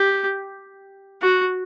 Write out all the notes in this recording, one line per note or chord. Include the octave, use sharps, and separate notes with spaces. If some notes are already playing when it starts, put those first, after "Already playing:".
Already playing: G4
F#4